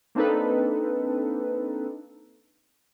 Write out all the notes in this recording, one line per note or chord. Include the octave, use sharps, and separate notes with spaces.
A#3 C4 D4 D#4 A4 B4